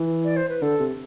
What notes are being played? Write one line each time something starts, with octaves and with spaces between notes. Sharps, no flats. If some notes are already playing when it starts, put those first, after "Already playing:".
Already playing: E3
D5
C5
B4
D3 A4
C3